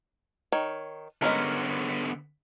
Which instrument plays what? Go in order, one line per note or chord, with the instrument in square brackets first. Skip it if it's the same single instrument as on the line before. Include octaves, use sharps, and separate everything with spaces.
[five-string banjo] D#3 C#5
[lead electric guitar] D3 B3 [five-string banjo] G#3 C#4 A#4